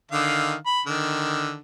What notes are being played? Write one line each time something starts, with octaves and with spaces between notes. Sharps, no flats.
D3 D#3 F5
B5
D3 D#3